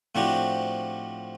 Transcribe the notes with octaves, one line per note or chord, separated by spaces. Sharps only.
A2 F3 C4 D4 F#4 G4